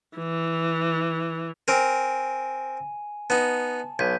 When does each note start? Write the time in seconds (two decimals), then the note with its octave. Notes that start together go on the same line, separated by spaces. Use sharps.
0.17 E3
1.68 C4 A#4 G#5 D#7
3.30 B3 D#4 A5
3.99 B1 G6 B6 D#7